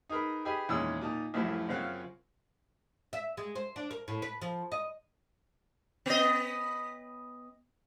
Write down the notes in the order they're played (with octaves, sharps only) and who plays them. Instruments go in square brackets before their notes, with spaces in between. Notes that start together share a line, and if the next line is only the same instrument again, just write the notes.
[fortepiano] D#4 G#4 A#4 B4
G4 G#4 B4 D#5 G#5
E2 A#2 D#3 G#3 C#4 E6
A#2 D#4 A5
C2 F#2 A2 F3
F#2 C#3 C4 F4 F5 F#5
[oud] E5
G#3
C5
D4
A#4
A2
B4
F3
D#5
[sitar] B3 D#5